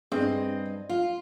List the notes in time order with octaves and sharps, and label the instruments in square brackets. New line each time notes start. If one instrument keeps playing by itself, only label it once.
[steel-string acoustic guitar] G2 D#5 [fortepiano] C4 G#4
[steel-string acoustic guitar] F4 [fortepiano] F5